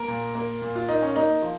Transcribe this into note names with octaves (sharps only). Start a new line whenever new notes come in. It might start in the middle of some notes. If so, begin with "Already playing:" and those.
Already playing: A#3 A#4
A#2
A#3
A#2
F4
A#3 D#4
C#4
A#3 D#4
F3